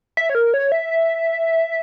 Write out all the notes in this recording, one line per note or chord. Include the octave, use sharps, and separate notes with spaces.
E5
C#5
A#4
C#5
E5